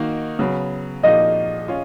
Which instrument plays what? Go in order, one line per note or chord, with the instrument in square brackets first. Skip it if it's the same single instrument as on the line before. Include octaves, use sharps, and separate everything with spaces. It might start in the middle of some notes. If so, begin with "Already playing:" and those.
Already playing: [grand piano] D#3 A#3 D#4 F#4
C#3 F#3 B3
[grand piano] A#2 F3 A#3 D#4 F#4 [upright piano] D#5
[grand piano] C#4 F4